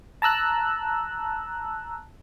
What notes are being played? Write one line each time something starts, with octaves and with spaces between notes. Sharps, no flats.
A5 A#5 E6 F#6